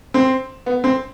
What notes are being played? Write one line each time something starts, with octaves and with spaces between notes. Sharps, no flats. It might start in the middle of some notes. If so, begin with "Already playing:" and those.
C4
B3
C4